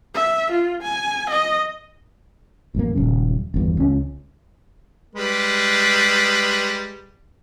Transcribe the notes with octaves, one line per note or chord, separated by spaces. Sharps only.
E5
F4
G#5
D#5
A1 F#2 A#3
D#1 F#2 C#3
G1 E2 G2
C#2 C#4
G3 G#3 B4